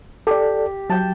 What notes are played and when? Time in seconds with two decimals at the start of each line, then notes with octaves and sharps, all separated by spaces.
0.27 G4 A4 D5
0.90 F#3 G5 A5